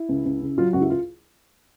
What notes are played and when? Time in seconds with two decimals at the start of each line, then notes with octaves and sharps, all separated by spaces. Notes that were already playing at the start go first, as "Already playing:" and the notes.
Already playing: E4
0.09 C#2
0.25 C#2
0.41 C#3
0.58 F#3 F4
0.73 C#2 F#4
0.82 E4
0.90 F4